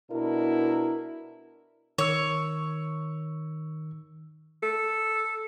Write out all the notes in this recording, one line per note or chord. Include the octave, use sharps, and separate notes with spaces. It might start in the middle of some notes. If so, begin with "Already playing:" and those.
B2 D4 E4 A#4
D#3 C#5 E6
A4